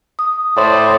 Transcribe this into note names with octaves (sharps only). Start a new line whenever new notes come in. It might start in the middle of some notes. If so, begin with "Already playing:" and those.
D#6
A2 C5 D5